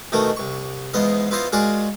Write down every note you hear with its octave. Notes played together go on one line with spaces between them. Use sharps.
B2 D#3 E3 A3 A#4
C2 C#6
E2 G#2 B3 D#5 F5
B3 E4 F4 C5 D#5 F5
G#3 F4 F#4 G#4 A#4 D5